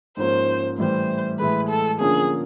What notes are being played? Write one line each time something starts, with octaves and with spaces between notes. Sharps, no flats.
G#2 F3 A#3 C#4 C5
A2 E3 G3 C5
A2 E3 G#3 B4
A4
D3 F3 A#3 C#4 G#4